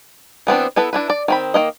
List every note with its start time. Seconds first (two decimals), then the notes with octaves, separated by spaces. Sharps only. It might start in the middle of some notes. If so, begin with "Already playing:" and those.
0.47 E3 B3 C4 D4
0.76 B3 E4 A4 B4
0.93 D4 E4 B4
1.10 D5
1.28 D#3 C4 B5
1.54 D#3 A#3 D#5